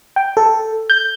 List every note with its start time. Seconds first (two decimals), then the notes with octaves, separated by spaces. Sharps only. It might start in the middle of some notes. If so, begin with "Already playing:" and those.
0.16 G5
0.37 A4
0.90 G6